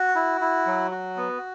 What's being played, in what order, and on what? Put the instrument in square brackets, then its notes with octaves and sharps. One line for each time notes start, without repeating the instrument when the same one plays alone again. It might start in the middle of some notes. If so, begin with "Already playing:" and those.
Already playing: [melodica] F#4
E4
E4
F#3
F#4
B3